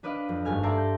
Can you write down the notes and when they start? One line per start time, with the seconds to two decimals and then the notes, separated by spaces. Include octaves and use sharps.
0.03 D4 B4 D5 D#5 F5
0.29 F2
0.45 G#1 G2 A3 G#5 F6
0.63 G4 D5 E5 A5 A#5 C6
0.77 G6